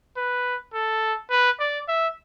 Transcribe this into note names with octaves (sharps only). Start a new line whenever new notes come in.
B4
A4
B4
D5
E5